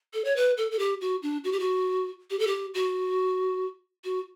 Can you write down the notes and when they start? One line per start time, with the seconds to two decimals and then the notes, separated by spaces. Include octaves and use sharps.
0.14 A4
0.25 C#5
0.36 B4
0.57 A4
0.71 A4
0.79 G4
1.01 F#4
1.23 D4
1.44 F#4
1.52 G4
1.60 F#4
2.30 G4
2.39 A4
2.47 G4
2.74 F#4
4.04 F#4